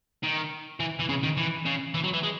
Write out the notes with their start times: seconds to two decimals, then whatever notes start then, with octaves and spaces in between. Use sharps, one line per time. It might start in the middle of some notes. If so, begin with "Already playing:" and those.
0.23 D#3
0.80 E3
0.99 E3
1.09 C#3
1.23 D#3
1.37 E3
1.66 C#3
1.95 E3
2.04 F#3
2.13 E3
2.23 G#3